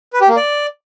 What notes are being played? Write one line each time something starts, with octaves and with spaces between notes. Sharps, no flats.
B4
G4
A#3
D5